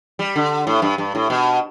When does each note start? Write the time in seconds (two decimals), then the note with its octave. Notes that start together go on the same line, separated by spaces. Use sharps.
0.19 G3
0.36 D3
0.67 A2
0.82 G2
0.98 G2
1.15 A2
1.30 B2